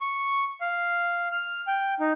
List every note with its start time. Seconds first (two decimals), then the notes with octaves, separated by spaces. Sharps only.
0.01 C#6
0.61 F5
1.32 F6
1.67 G5
2.00 D#4